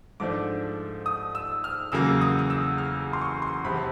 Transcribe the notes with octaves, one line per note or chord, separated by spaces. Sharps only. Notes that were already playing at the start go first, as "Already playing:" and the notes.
G#2 F3 A3 D4 D6
D#6
E6
F6
E2 C#3 F#3 A#3 E6
D#6
D#6
E6
F6
C6
C#6
C6
E1 E2 C3 B5